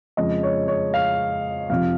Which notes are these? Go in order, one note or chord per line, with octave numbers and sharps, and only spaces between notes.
F2 C#3 G#3 D#5
C#5
C#5
F5
F2 C3 F3 F5